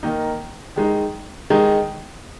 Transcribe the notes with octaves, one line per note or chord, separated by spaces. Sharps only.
D#3 A#3 D#4
D#3 G#3 D#4
D#3 G#3 D#4